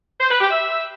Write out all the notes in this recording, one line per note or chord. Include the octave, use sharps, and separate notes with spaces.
C5
B4
G4
E5